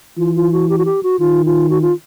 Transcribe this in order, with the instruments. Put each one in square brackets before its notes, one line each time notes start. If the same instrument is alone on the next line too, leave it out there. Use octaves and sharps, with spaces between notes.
[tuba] E3 [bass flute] F4
[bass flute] F4
F#4
G4
F#4
G4
F#4
[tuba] D#3 [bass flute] F4
[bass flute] F4
F#4
F4